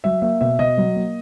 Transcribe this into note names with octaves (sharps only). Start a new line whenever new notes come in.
F#3 E5
A#3 E5
B2 E5
B2 D#5
F#3
A#3